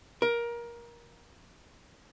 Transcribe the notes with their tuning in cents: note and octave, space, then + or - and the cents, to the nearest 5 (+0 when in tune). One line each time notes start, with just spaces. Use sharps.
A#4 +20